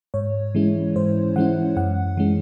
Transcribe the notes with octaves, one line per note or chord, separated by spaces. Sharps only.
G#2 C#5
E3 G#3 C#4 E4
G#2 C5
E3 G#3 C#4 E4 F#5
F#2 F#5
E3 G#3 C#4